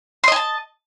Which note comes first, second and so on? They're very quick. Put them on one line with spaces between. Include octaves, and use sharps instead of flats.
C6 D#5 G#5 A5